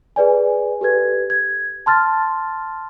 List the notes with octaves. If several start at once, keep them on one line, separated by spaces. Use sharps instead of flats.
G#4 B4 D5 G#5
G4 A4 B4 G#6
G#6
A5 C6 F6 A6